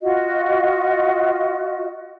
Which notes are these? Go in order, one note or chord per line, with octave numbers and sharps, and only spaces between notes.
F4 F#4 D#5